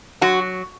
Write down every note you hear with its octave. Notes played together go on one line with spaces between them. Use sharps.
F#3 F#4